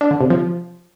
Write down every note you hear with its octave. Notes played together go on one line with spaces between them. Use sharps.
D4
D3
C3
F3